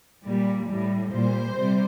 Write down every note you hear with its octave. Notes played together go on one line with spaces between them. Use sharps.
A#2 G3
A2 G3
A#2 G3 C5
C3 G3